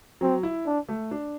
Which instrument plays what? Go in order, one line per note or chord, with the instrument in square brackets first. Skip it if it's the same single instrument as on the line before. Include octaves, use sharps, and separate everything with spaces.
[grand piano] F#3 [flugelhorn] C4
[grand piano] E4
[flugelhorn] D4
[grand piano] A3
D4